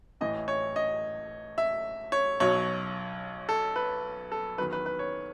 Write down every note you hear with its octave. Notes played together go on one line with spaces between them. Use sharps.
A1 A2 E3 D#5
C#5
D#5
E5
C#5
B1 B2 F#3 C#5
A4
B4
A4
E2 D#3 F#3 B4
B4
B4
C#5